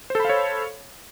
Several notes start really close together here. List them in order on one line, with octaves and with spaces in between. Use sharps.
C5 A4 B5 F5 C#5